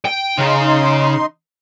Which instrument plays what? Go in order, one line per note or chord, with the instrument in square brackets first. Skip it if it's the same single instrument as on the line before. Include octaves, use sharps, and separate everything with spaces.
[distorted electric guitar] G5
[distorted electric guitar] C#3 [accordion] D#4 C6